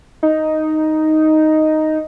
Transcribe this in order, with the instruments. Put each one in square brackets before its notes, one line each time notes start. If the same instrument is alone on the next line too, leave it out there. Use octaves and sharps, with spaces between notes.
[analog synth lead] D#4